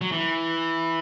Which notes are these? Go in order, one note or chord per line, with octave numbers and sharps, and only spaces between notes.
F#3
E3